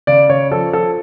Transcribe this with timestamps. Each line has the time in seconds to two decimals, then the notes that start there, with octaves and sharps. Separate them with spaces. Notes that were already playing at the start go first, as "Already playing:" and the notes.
0.07 C#3 D5
0.29 C#3 C#5
0.51 F3 A4
0.73 F3 A4